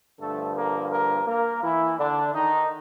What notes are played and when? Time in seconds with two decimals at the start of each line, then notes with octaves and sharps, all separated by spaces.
0.19 G2 D3 F3 A3 A4
0.55 A#3 A#4
0.91 A#3 A#4
1.27 A#3 A#4
1.62 E3 E4
1.99 D3 D4
2.34 D#3 D#4